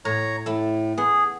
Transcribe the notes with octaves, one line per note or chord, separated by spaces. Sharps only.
A2 C#5 A#5
A2 E4 A4
B3 G#4